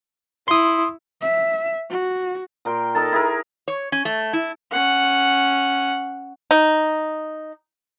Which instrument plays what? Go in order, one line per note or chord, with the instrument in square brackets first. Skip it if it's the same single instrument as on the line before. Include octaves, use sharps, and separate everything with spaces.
[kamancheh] E4 [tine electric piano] C6 D#6
[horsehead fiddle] E5
F#4
[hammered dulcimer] A#2 A#4 G5 C6
D#4 A4 A#4 A5
E4 G#4 A#4
[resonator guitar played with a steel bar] C#5
C#4
A3
E4
[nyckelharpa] C#4 F#5
[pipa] D#4